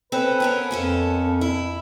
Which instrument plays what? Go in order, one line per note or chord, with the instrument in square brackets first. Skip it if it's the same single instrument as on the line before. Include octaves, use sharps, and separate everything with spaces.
[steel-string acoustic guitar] C4 C#4 A4 [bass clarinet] B4
[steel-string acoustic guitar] B3 C#4 A#4
[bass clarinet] F2 [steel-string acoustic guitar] A#3 C#4 A4
[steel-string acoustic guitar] E4